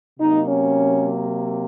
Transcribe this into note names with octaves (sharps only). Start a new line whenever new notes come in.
C3 F#3 A#3 D#4
C#4